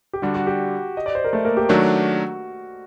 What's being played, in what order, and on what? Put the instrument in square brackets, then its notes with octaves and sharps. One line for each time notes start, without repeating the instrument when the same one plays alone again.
[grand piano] G4
[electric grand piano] D3 G3 D4 [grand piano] F#4
[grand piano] F#4
G4
D#5
D5
C5
A#4
A3 A4
A#3 A#4
G4
[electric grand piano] D#3 F#3 A3 D4 [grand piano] F#4